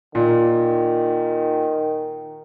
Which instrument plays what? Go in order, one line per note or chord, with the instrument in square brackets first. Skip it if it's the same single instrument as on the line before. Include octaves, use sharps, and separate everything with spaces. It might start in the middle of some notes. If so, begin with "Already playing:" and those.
[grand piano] A#2 [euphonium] D#3